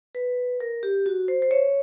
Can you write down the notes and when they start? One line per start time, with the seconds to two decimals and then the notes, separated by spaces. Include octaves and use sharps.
0.15 B4
0.60 A#4
0.83 G4
1.06 F#4
1.28 C5
1.42 C5
1.51 C#5